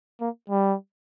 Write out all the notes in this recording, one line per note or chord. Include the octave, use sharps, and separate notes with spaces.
A#3
G3